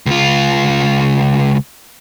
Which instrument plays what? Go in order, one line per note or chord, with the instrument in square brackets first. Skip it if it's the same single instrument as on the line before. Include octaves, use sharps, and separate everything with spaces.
[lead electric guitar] C#2 F4